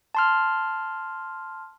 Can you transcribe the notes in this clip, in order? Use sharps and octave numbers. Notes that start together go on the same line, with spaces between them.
A5 C6 F6